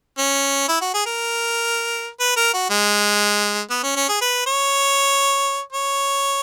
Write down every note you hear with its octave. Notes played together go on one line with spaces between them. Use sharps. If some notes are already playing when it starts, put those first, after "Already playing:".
C#4
E4
F#4
G#4
A#4
B4
A#4
F#4
G#3
B3
C#4
C#4
G#4
B4
C#5
C#5